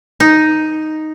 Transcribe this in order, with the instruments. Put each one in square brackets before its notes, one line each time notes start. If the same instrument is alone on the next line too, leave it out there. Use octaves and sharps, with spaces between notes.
[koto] D#4